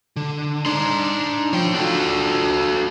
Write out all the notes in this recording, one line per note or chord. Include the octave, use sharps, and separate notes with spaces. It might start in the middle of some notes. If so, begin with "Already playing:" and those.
D3
D4 D#4 D5 C6
F3 C#5 G5
D4 F4 F#4 A4